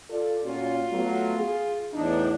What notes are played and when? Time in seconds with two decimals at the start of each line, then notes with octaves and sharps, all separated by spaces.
0.10 F4 A4 D5
0.44 A#2 C#4 F4 F#4
0.92 F#3 A3 B3
1.38 G#4
1.93 E2 A2 D4 D#4